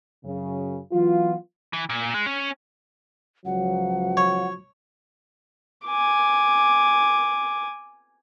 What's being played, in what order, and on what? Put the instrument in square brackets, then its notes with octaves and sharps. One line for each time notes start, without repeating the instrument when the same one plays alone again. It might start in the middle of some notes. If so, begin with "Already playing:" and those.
[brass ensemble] F#2 C#3
E3 F#3 B3 F4
[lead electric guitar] E3
A#2
G#3
C#4
[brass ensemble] C#2 F3 F#3 [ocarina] F#5
[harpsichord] C#5
[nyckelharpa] G#5 D6